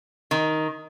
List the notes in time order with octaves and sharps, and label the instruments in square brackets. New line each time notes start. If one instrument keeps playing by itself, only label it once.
[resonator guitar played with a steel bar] D#3